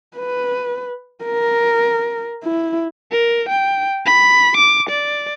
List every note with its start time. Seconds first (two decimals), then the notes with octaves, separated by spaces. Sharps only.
0.17 B4
1.24 A#4
2.43 E4
3.12 A#4
3.49 G5
4.06 B5
4.57 D6
4.90 D5